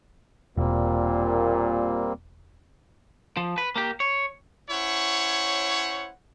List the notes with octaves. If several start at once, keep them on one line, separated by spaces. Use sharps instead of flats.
E1 A#2 G3 A#3 C4
F3
B4
A#3 G4
C#5
C#4 E4 C5 C#5 F#5